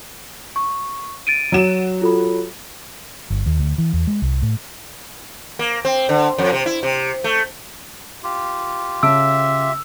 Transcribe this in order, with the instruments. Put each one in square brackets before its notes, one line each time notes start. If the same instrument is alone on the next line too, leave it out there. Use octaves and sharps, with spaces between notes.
[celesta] C#6
A6 D7 D#7
[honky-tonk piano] F#3 F#4 E7
[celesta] F4 A4 B5
[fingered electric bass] G1
D#2
D2
E3
E2
G#3
C2
A2
[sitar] A#3
C4
D3
F2
C3
E4
C3
A3
[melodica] F4 G4
[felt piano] C#3 A5 D7 [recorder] E5 [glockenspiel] E6